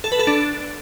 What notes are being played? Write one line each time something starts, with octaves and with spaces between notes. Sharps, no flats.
A4
B4
A4
D4